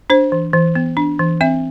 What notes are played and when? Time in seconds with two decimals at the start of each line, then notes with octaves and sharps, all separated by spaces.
0.10 D4 C5
0.32 E3
0.53 E3
0.75 B3
0.97 D4
1.19 E3
1.41 C4 E5